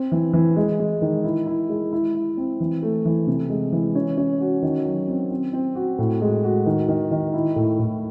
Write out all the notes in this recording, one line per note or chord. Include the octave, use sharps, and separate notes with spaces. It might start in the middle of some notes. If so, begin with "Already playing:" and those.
Already playing: C4
E3
E3
G#3
G#3
D#3
E4
E4
G#3
E4
E4
C4
E3
A3
E3
C3
G#3
E3
C#4
C#4
F#4
D#3
F#3
C4
C4
C4
F#4
A2
G#3
F#4
D#3
D#3
D#3
E4
A2
A2